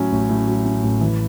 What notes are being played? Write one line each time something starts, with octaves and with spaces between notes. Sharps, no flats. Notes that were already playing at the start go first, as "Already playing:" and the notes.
Already playing: A2 F#3 C#4
A1
A2
F#3
C#4
A1
E3